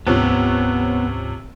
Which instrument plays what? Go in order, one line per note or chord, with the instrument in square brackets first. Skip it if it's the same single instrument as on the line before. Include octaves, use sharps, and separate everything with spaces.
[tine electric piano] D2 G#2 [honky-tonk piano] C3 F3 C#4 [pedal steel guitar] B3